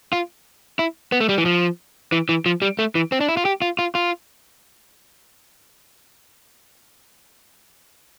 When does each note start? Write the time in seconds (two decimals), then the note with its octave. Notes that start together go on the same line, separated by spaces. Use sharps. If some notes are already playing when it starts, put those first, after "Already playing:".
0.13 F4
0.79 E4
1.12 B3
1.20 A3
1.29 G3
1.38 E3
1.46 F3
2.12 E3
2.29 E3
2.46 F3
2.62 G3
2.79 A3
2.95 E3
3.12 C4
3.21 D4
3.28 E4
3.37 F4
3.45 G4
3.62 F4
3.79 F4
3.95 F4